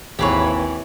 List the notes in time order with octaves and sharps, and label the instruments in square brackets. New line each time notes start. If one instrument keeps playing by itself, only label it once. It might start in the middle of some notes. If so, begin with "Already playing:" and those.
[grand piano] G#1 D#2 [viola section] E3 [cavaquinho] G4 G#4 C#5